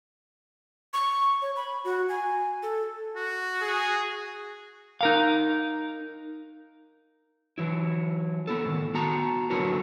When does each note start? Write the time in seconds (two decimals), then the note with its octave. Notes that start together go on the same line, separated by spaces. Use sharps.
0.93 C#6
1.42 C#5
1.56 B5
1.84 F#4
2.09 G#5
2.63 A4
3.16 F#4
3.62 G#4
5.01 D#4 A#4 F5
7.58 E3 F#3 E4
8.47 B3 E4 A4
8.65 A2 D#3
8.94 B3 F#4 A5 A#5
9.50 D3 F#3 E4 F#4 A#4 B4